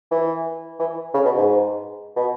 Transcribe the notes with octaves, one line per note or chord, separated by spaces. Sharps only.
E3
E3
C#3
B2
G#2
B2